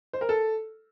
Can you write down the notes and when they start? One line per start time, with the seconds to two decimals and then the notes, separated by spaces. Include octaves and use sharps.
0.13 C5
0.21 A#4
0.29 A4